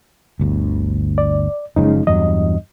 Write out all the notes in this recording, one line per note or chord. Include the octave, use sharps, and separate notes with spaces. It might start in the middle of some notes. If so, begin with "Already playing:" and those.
G1 D2
D5
F#1 C#3 F3 G#3 C#4 D#4
E2 G2 F#3 D#5